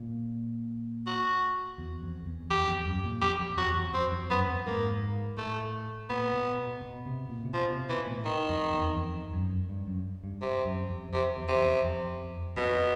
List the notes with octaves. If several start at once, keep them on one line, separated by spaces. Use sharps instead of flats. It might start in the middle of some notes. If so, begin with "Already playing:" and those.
Already playing: A#2
F#4
E2
F2
E2
E2 G4
F2
F#2
A#2
F2 G4
F2
E2 F#4
F2
F2 C4
F2
F#2 B3
F2
G#2 A#3
A2 A3
A#2 B3
B2
B2
B2
C3
A#2
C3
B2 F3
C3
B2 E3
A2
D#3
F2
E2
F2
F#2
G2
F#2
G2
C3
F#2
F2
F2 C3
E2
C3
F2
F2
F2 B2